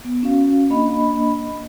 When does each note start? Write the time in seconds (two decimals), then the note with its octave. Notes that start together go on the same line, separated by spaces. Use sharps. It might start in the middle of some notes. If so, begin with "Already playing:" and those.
0.05 B3
0.23 C#4 F#4 F5
0.70 A#3 D4 D#5 B5